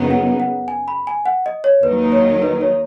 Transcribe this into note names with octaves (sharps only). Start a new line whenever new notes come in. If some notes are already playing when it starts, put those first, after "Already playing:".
Already playing: F#2 C#3 F#3 B3 D#4
F#5
F#5
G#5
B5
G#5
F#5
D#5
C#5
D#2 D#3 F#3 D#4 B4
C#5
B4
C#5